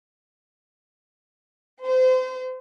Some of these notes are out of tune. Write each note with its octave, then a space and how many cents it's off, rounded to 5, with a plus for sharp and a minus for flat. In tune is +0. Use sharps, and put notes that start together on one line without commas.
C5 -30